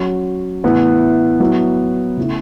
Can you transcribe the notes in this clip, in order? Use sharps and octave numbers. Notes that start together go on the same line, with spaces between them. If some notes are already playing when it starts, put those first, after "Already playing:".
Already playing: F#3 C#4 F#4
A2 E3 B3
F#3 B3 E4
C#3 A3 E4